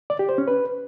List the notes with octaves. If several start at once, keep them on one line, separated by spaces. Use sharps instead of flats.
D5
G4
C5
C#4
B4